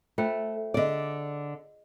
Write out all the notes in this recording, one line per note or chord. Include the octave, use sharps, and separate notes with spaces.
A3 F4 C5 G5
D3 G#4 D5 D#5